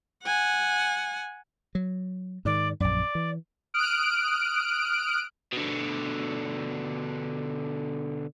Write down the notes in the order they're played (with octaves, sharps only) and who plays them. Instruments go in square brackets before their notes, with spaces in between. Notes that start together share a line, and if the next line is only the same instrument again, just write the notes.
[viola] F#5 G#5
[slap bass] F#3
[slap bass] G#2 D#3 [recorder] D5
[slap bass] A#1 F#2 [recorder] D5
[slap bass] E3
[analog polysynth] D#6 F6 F#6 D7
[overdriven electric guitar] B2 D3